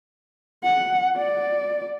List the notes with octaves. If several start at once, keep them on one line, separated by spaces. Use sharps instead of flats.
F#5
D5